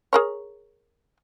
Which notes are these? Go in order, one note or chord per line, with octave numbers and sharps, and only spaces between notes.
G#4 A#4 C#5